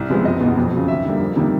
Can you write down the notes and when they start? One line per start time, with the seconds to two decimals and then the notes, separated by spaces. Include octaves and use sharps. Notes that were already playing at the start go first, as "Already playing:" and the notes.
Already playing: C2
0.10 C3 F3 G#3 B3
0.25 F#1 D#5
0.41 B2
0.46 E2
0.57 F2
0.72 C#3 F#3
0.88 D#2 E5
1.05 D3 G3 A#3
1.20 F2
1.36 C3 D#3 G3 A#3